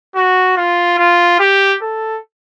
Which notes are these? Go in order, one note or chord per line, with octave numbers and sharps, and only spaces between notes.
F#4
F4
F4
G4
A4